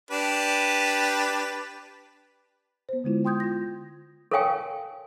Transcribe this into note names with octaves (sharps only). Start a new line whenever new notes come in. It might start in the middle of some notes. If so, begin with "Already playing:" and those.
D4 G4 B4
B3 C5
D3 G#3 E4 F4
G5 C6 D#6 G6 G#6
F4 A#6
A4 A#4 C#5 F5 G5 G#5